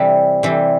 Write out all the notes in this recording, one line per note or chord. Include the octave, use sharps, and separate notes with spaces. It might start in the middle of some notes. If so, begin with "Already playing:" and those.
Already playing: C3 E3 G3
C3 E3 G3